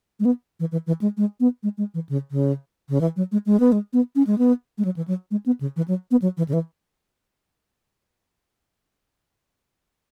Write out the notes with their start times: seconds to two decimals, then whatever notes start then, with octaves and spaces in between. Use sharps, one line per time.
0.20 G#3
0.25 B3
0.60 E3
0.72 E3
0.87 E3
1.01 G#3
1.17 G#3
1.40 B3
1.63 G#3
1.78 G#3
1.94 E3
2.09 C#3
2.31 C#3
2.89 C#3
3.01 E3
3.16 F#3
3.32 G#3
3.46 G#3
3.60 B3
3.72 G#3
3.93 B3
4.16 C#4
4.27 G#3
4.38 B3
4.78 G#3
4.85 F#3
4.97 E3
5.08 F#3
5.31 G#3
5.46 B3
5.61 C#3
5.76 E3
5.88 F#3
6.11 B3
6.22 F#3
6.37 E3
6.48 C#3
6.53 E3